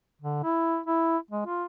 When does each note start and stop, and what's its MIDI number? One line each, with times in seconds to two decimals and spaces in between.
0.21 0.40 50
0.43 0.79 64
0.86 1.17 64
1.31 1.45 56
1.46 1.64 65